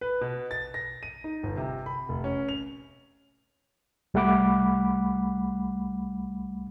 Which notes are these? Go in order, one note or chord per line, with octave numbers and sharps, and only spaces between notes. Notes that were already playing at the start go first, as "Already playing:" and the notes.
B4
B2
A6
A#6
D#7
D#4
G1
C3
B5
F1
C#4
F7
C2 G3 A3 F#5 B5 D6